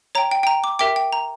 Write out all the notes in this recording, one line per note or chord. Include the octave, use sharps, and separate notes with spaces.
C#5 G5 A#5
G5
G5
A#5
D6
G4 A#4 E5 G5 D6
G5
A#5